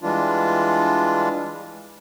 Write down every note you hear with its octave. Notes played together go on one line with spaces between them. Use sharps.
E3 G3 G#3 D4 F4